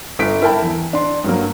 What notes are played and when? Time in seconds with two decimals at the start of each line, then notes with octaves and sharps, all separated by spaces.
0.19 G1 B6 D7
0.42 E4 A#4 G5 A5 B5
0.63 E2
0.93 D4 C6
1.24 G2 F#3 A#3